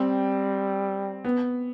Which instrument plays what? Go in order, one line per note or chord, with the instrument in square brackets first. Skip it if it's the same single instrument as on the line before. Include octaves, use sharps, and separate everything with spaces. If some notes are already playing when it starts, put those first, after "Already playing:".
Already playing: [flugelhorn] G3 [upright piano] C4
[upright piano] B3